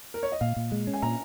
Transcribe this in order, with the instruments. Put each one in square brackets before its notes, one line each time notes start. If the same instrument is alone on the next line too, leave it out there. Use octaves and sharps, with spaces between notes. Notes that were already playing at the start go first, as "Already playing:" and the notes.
[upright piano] A#4
C#5
D#5
[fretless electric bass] A#2 [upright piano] F5
[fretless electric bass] A#2
G#3
C#4
[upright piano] G#5
[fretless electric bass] A#2 [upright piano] A#5